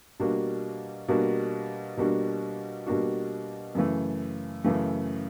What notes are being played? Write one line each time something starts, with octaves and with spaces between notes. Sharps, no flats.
B2 G3 A#3 D4 F#4
B2 G3 A#3 D4 F#4
B2 G3 A#3 D4 F#4
B2 G3 A#3 D4 F#4
F#2 C#3 E3 A3
F#2 C#3 E3 A3